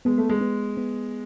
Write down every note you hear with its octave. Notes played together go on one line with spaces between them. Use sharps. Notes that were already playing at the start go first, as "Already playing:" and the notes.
G#3 B3
A3
G#3
B3
B3